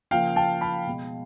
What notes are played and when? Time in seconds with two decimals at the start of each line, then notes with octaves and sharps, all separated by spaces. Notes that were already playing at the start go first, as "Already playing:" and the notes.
0.11 C#3 F3 A#3 F5 G5
0.36 G5 A5
0.61 A5 B5
0.87 B2 G#3